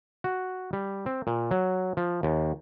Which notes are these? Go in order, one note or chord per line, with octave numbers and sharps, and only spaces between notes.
F#4
G3
C4
A#2
F#3
F3
D#2